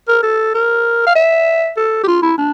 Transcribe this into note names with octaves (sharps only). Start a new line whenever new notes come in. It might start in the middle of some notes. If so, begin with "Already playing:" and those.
A#4
A4
A#4
F5
E5
A4
G4
F4
E4
D4